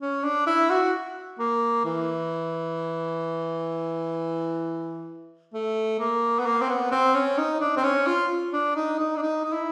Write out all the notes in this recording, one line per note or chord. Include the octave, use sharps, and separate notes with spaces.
C#4
D4
E4
F#4
A#3
E3
A3
A#3
B3
A#3
C4
B3
C4
C#4
D#4
D4
C4
C#4
F4
D4
D#4
D#4
D4
D#4
D#4
E4